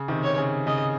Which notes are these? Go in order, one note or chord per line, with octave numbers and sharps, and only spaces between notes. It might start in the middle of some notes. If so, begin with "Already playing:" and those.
Already playing: C#3
C3 D#3
C#5
C#3
C#3 D#5